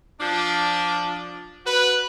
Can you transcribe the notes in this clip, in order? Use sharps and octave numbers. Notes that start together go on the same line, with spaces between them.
F3 D4
F#4 B4